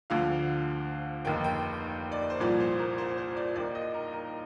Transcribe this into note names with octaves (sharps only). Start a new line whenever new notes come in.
D2 D3 F3 F5
F1 D#2 D#3 G5
G5
D5
C5
C2 A#2 F3 D5
C5
A#4
C5
C5
D5
D#2 D#3 D5
D#5
A#4
A#4